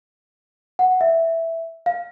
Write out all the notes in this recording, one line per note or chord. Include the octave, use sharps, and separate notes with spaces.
F#5
E5
F5